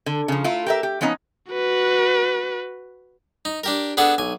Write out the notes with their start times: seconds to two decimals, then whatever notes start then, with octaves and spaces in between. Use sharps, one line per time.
0.06 D3
0.28 C#3 F3
0.44 A3 E4 F4
0.66 G4 A#4 E5
0.83 G4
1.01 F3 B3 C#4 D#4
1.52 F#4 B4
3.45 D#4
3.64 D4 G4 A#4
3.97 B3 D4 G#4 A4 F#5
4.18 B1 G#5